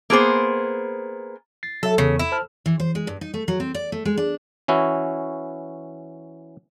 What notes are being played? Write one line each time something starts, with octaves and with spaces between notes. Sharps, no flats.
A#3 B3 G#4 C5
A6 C7
F#3 A4 E5
E2 C#3
E4
C5 A5 F6
E3
C5
G#3
G2
D#4
A3
F#3
C4
D5
A3
G#3
D4
E3 C#4 E4 F#4